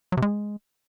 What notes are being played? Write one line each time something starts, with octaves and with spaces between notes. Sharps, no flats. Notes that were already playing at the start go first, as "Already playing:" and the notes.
F#3
C3
G#3